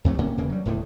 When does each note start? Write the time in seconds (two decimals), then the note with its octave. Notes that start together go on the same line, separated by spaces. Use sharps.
0.04 D2 C3 F#3 A3
0.18 D1 C3 A#3 C#4
0.38 E1 C#3 E3 A#3
0.49 F#3 G3
0.65 E1 A2 D3 D#3